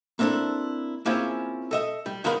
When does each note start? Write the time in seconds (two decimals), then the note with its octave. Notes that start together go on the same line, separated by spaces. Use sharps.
0.19 A#3 C4 D4 E4 A4
1.06 A#3 C4 C#4 E4 F4 G#4
1.71 A4 D#5 E5
2.06 G3
2.24 G#2 D#3 B3 A#4 F5 B5